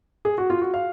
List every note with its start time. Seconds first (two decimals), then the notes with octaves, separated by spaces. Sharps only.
0.25 G#4
0.38 F#4
0.50 F4
0.62 F#4
0.74 F5